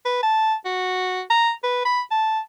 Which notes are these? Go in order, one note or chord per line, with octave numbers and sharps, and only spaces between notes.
B4
A5
F#4
A#5
B4
B5
A5